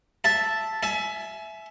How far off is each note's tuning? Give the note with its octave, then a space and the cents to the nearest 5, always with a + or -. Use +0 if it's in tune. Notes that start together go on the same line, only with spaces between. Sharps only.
E5 +0 A5 +0
E5 +5 G#5 +35